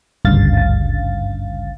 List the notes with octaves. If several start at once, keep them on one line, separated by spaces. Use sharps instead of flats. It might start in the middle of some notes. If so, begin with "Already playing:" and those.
G#1 D2 G2 C#3 F5 A6